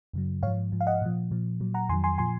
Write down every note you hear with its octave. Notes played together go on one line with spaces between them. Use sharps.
F#2 C#3 F#3
G#2 F3 C#5 F5
G#2 F3
F5
D#5 F#5
A#2 F3
A#2 F3
A#2 F#3
F#5 A#5
F2 D#3 F#3 G#5 C6
G#5 C6
A#2 F3 G#5 C6